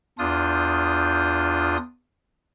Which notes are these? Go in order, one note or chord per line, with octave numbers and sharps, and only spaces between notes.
E2 D4 F4 D#6 G6